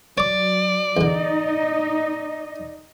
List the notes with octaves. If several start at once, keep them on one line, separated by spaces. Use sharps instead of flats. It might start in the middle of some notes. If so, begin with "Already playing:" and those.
F#3 C#5 D5 D6
E2 D3 D#4 D#5